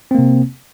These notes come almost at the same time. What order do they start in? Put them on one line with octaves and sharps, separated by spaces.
C4 A#3 C3